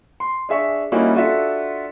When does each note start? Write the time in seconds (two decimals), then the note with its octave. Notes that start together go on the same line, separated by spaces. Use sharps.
0.20 C6
0.49 D4 G#4 E5 C#6
0.92 G3 A#3 C#4 D#4 E4 F#4
1.14 D4 F4 F#4 A4 E5